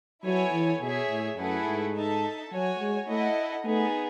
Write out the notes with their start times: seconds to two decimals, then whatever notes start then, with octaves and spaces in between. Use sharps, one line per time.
0.24 F#3 B3 E4 A4 C#5 G#5
0.53 E3
0.81 B2 G#4 C#5 E5
1.09 A2
1.37 F#2 A3 E4 G#4 B4 F#5
1.66 G#2
1.95 D#4 A4 E5 A5
2.51 F#3 F#4 C#5 G#5
2.79 G#3
3.08 A3 E4 A4 D#5 F#5
3.64 A3 B3 D#4 G#4